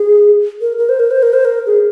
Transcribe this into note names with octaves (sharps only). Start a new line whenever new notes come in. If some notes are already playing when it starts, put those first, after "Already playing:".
Already playing: G#4
A#4
A#4
C5
A#4
C5
A#4
C5
A#4
G#4